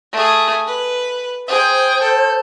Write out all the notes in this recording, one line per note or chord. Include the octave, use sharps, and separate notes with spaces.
A3 G#4
B4
G#4 C5 G5
A4